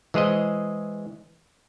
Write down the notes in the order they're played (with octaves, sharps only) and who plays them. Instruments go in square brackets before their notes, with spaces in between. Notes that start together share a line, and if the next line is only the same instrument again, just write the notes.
[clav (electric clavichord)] E3 G#3 G#4 C5 D#5